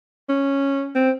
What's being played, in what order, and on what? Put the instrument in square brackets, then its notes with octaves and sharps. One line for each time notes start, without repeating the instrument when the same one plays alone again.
[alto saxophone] C#4
C4